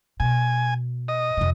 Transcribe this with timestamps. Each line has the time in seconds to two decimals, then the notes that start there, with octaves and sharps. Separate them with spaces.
0.20 B2 G#5
1.08 D#5
1.37 F2 C3